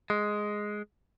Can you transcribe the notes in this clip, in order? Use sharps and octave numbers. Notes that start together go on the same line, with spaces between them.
G#3